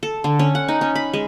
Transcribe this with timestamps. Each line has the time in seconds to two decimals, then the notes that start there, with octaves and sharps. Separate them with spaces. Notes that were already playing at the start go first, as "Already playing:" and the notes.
0.03 A4
0.24 D3
0.39 C#4
0.55 F#5
0.68 D#4
0.81 C#4
0.95 B5
1.14 G#3